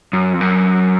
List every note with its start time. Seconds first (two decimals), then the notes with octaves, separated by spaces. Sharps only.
0.13 F#2
0.33 F2
0.41 F#2